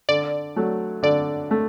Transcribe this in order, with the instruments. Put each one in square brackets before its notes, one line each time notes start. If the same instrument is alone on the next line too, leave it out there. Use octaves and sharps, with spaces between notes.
[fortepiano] D3 [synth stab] D5
[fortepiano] F#3 A3
[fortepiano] D3 [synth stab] D5
[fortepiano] A3